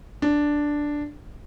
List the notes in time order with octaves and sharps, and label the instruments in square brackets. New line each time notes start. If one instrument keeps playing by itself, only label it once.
[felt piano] D4